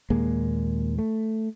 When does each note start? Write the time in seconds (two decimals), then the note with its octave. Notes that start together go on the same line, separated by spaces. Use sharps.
0.10 D#2 A#2 G#3 A#3
0.98 A3